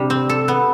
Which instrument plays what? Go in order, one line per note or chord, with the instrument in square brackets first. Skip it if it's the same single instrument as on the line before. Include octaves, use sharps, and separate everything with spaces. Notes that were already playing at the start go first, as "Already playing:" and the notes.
Already playing: [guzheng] C3 G3 D4
C4
A4
B3